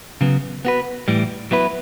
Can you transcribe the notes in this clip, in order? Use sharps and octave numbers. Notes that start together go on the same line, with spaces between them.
C#3 F#3 B3
B3 F#4 B4
A2 E3 G3
F#3 B3 E4 B4